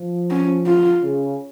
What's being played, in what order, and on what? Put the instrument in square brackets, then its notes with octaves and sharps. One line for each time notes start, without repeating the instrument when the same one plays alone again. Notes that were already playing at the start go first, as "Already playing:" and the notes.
Already playing: [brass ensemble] F3
[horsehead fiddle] C#4
F4
[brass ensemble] C#3